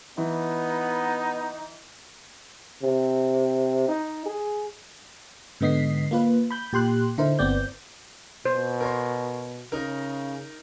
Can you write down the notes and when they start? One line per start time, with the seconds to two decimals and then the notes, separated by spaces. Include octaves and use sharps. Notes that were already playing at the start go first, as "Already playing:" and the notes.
0.18 E3 B3 D#4
2.83 C3
3.88 D#4
4.26 G#4
5.61 G#2 D3 B3 D#5 B6 C7
6.11 A#3 F4 B4
6.51 B5 G6
6.72 A#2 G4 C6 F#6
7.18 D3 D#4 E4 A#4 C5
7.39 G1 B3 C4 D5 G6
8.46 B2 C5
8.81 A#4 C#5 C6
9.72 C#3 D#4 A#4